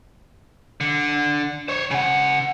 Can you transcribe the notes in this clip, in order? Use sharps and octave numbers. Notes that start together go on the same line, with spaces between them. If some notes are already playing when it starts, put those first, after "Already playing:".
D3
C5 C#5
C#3 F#5